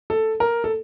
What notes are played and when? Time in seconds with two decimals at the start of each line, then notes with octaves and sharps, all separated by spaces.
0.10 A4
0.40 A#4
0.64 A4